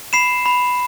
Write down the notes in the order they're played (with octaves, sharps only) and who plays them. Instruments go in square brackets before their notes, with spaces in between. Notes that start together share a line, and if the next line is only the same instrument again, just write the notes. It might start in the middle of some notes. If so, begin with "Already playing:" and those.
[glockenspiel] B5 C7 E7
B5